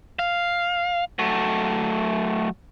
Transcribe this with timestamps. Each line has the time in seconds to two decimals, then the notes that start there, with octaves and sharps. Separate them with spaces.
0.19 F5
1.19 F#3 A3